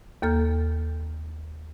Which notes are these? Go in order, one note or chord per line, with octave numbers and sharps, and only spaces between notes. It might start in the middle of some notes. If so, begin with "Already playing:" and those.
D#2 A#3 A4 F6 G6